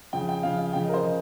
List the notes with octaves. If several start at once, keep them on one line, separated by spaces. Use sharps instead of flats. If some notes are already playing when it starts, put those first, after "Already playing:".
F2 C#3 G5
G5
F2 C#3 F5
F5
F2 C#3 G5
D#5
A#4
C5
C#3 D#5